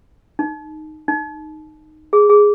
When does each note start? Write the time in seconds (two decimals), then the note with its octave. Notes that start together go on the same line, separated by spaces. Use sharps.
0.39 D#4
1.08 D#4
2.13 G#4
2.29 G#4